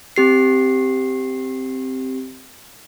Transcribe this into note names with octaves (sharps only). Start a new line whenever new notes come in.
C4 G4 C7